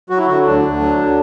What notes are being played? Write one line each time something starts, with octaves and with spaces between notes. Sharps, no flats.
F#3 F#4
E4
D3 F#4
D2 D4
D2
F#3
D3